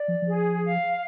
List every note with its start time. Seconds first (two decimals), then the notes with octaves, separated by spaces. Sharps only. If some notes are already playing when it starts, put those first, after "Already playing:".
Already playing: D5
0.08 F3
0.22 F3 G#4
0.64 F5